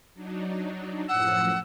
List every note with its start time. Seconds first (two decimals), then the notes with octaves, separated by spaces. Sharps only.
0.14 F#3 D4 D#4
1.09 F#2 A2 F3 F#5 E6